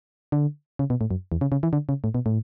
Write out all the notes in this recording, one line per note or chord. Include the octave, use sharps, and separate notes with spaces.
D3
C#3
B2
A2
F#2
E2
C#3
C#3
E3
D3
C#3
A2
B2
A2